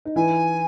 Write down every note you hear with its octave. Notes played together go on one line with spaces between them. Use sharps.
D#4
E3 E4 G#5